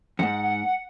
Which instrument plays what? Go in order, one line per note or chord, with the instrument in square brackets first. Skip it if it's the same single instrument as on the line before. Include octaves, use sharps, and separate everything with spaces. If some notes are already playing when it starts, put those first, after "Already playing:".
[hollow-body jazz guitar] F2 G#2 [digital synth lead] F#5